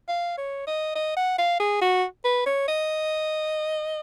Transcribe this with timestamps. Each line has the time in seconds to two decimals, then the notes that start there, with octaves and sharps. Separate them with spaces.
0.09 F5
0.38 C#5
0.67 D#5
0.96 D#5
1.17 F#5
1.38 F5
1.60 G#4
1.82 F#4
2.25 B4
2.46 C#5
2.68 D#5